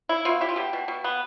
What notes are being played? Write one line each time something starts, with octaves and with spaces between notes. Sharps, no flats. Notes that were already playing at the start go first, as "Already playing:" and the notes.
E4
B2 F4
E4 G4
F4
B2 G4
B2
B2
B3